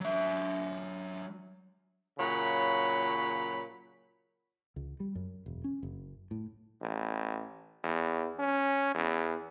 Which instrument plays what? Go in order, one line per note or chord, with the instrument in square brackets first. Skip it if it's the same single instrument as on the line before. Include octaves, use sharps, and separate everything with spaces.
[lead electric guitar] F#3 E5
[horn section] A#2 C#3 F#3 C#5 B5
[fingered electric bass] C#2
G3
F#2
E1
C#4
F#1
A2
[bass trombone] A1
E2
C#4
E2